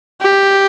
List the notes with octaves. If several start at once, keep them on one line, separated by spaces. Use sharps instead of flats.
G4